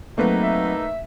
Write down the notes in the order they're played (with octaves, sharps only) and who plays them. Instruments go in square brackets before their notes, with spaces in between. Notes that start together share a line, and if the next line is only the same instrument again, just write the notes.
[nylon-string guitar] F#3 C4 [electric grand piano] A3 A#3 B4 [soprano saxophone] D#4
[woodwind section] E5